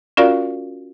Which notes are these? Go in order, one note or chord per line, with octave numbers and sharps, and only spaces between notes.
C#4 F4 F#4 A#4 D5 F5